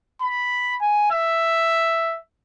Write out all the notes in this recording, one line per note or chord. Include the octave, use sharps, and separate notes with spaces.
B5
G#5
E5